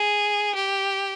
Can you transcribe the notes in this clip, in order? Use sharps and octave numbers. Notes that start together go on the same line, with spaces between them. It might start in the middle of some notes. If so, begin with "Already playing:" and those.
Already playing: G#4
G4